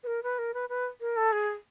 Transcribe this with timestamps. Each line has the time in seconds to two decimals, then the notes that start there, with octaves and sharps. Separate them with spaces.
0.03 B4
0.07 A#4
0.23 B4
0.38 A#4
0.54 B4
0.69 B4
1.01 A#4
1.17 A4
1.32 G#4